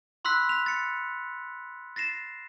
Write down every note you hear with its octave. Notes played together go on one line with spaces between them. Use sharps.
B5 C6 E6 F#6 B6
B6 F7
A6 C#7
A6 A#6 C7 E7